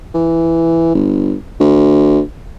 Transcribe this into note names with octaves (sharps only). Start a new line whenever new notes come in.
E3
G1
D2